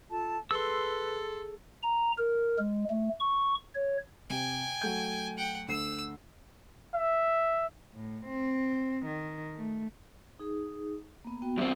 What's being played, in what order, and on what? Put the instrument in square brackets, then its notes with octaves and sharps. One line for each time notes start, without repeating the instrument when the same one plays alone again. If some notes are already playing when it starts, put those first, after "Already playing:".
[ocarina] F4 [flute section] A4 A5
[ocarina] G#4 [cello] A4 [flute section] B4 [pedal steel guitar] C6 E6
[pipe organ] A#5
A#4
G#3
A3
C#6
C#5
[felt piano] C3 [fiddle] G5 G#5
[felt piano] F#3 A3 G6
[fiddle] F#5 G5
[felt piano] D2 C7 [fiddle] E6
[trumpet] E5
[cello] A2
C4
D#3
A3
[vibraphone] D#4 G#4
A#3 B3
B3 F#4 G5
[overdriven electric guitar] G2 C4 [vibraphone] E5